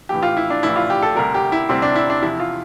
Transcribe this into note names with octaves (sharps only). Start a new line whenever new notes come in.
A#1 A2 E3 G4
F4
E4
D4
A#1 A2 E3 E4
F4
G4
A4
D2 C3 G3 A#4
G4
E4
D2 C3 G3 C4
D4
E4
D4
E2 C3 F3 E4
F4